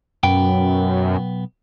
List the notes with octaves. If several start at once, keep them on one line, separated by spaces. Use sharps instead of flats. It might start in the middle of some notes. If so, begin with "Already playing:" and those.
B1 F#2 B3 G5